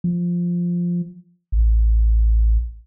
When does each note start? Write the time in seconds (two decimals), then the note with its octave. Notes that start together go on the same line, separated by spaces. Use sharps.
0.04 F3
1.52 A1